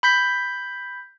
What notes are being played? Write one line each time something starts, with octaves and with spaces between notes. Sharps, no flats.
B5 G6 B6